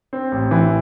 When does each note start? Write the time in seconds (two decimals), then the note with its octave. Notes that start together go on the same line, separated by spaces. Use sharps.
0.13 C4
0.32 A1
0.51 E3